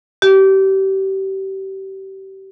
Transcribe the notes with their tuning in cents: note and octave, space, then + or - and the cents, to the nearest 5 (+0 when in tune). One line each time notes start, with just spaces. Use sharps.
G4 -30